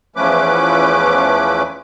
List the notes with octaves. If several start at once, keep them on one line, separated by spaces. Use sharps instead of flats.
E2 F3 A3 C#4 B4 D6